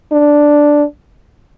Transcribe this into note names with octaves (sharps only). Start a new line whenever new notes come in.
D4